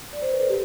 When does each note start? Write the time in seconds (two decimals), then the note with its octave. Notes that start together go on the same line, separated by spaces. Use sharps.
0.13 D5
0.22 C5
0.32 B4
0.40 A4
0.50 G4